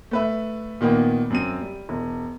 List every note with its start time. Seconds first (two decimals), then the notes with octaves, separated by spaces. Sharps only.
0.11 A3 B4 E5
0.81 A#2 D#3 A#3 B3
1.30 F#2 C4 D#7
1.61 G3
1.89 E1